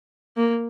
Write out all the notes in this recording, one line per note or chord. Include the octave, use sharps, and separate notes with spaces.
A#3